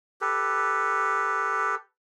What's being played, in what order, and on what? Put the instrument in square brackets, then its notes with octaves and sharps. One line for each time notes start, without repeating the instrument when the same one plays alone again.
[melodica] G4 A4 B4